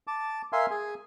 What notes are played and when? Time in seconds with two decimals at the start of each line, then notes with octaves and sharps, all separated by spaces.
0.07 A5 D6
0.53 A#4 E5 F5 G#5 C6
0.71 G#4 G#5